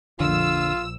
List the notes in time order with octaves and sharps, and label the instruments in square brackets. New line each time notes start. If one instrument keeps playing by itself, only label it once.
[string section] A#1 E6 [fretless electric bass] F2 D3 [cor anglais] F4